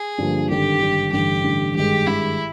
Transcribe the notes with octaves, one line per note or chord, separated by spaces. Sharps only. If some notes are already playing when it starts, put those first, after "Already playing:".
Already playing: G#4
G2 D3 F3 A#3
G#1 G2 D3 G4
G#1 G2 D3
A1 G2 D3 G4
A1 G2 D3
G#1 G2 D#3 G#3 G4
G#1 G2 D#3 G#3 E4